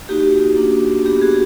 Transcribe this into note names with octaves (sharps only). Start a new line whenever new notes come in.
A#3 D#4 F#4 G4
A#3 D4 F#4
B3 D4 F#4 G4
F#4 G#4